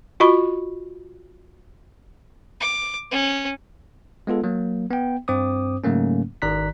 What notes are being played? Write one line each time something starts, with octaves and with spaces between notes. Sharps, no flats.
F4 F#4 D#5 B5 C#6
D6
C#4
G#3 B3 F4 A4
F#3 A#3
B3 G5
G2 C4 C5 D6 D#6
G#2 C#3 F#3 A3 A#3 C#4
G#1 D#3 D5 A#5 F#6 B6